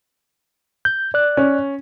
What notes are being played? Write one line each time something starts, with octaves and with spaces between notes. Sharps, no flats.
G6
D5 F#6
C#4